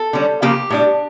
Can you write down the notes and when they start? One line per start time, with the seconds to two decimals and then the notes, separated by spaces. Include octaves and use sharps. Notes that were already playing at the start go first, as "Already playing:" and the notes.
Already playing: A4
0.13 D3 G3 C#4
0.42 C#3 F3 A#3 G4
0.70 A2 G3 D4